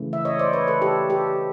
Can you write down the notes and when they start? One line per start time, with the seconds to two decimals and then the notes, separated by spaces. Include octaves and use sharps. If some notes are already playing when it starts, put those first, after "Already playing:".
Already playing: C#3 E3 A3
0.13 E5
0.25 C#5 D#5
0.39 C5 D5
0.53 B4 C#5
0.67 A4 B4
0.82 G4 A4
1.10 G4 A4